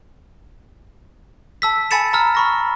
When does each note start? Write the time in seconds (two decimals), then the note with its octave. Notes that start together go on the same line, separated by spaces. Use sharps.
1.62 A5 E6 B6
1.91 G#5 A5 B5 A6 C#7 E7
2.13 A#5 E6 F6
2.35 B5 C#6 A#6